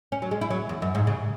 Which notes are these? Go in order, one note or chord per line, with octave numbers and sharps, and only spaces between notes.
C#4
F#3
G#3
E4
F#3
E2
F#2
G#2
C#3